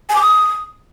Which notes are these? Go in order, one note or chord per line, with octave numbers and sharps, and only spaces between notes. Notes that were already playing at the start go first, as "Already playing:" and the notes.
G#5
D6
D#6